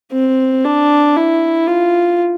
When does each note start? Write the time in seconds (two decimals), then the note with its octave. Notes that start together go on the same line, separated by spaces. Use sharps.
0.12 C4
0.65 D4
1.17 E4
1.67 F4